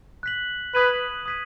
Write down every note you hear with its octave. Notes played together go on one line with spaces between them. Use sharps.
F#6 B6 F#7
B4 D#6 G#6 B6 D#7 F#7
D#6 G#6 B6 D#7